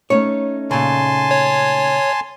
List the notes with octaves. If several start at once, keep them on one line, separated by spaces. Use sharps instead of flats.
A3 C#4 D#4 C#5
A#2 C#3 G#5 A5 C6
C#5